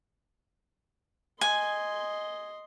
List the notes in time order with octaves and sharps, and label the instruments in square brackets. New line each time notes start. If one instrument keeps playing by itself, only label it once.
[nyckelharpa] D#5 C6 [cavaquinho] G#5